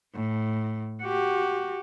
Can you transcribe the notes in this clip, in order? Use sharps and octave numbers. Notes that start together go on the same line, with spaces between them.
A2
F#4 G4